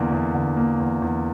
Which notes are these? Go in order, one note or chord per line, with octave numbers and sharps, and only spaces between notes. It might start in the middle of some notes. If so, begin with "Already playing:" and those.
Already playing: E2 D3 A#3
E2
D3
A#3
E2
E2